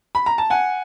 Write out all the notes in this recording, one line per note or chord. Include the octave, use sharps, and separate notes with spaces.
B5
A#5
A5
F#5 G#5